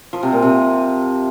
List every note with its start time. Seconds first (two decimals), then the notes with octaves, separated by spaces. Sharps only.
0.13 F3
0.23 C3
0.33 A#2
0.42 C3